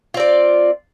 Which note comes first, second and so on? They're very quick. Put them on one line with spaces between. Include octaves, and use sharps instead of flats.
F4 C4 D5